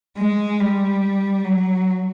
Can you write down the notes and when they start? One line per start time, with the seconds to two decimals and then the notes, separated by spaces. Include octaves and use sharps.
0.18 G#3
0.60 G3
1.45 F#3